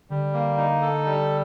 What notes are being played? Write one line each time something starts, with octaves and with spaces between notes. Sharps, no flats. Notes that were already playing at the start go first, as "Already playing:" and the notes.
D3 G3
A#3
D#4
A4
G3